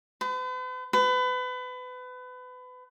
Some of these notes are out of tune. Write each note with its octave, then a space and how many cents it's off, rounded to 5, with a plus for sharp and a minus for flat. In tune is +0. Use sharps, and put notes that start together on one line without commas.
B4 +45
B4 +30